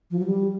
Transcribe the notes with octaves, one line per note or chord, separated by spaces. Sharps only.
F3
F#3
G3